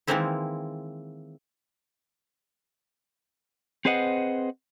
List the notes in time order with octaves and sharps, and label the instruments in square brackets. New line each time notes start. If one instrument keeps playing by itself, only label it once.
[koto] D#3 E3 G#3 A#3 C4 E4
[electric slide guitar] C4 G#4 B4 C5 D#5 F#5